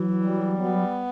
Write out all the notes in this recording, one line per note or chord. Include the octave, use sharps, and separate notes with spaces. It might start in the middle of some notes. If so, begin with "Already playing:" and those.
Already playing: E3 F#3
G3
B3